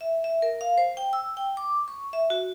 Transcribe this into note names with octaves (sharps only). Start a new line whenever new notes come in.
E5
E5
A#4
F5
C5
G5
E6
G5
D6
C#6
E5
F#4